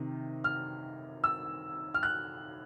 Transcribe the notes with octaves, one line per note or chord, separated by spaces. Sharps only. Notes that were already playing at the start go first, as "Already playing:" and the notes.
Already playing: C3 D#3
F6
E6
F6
F#6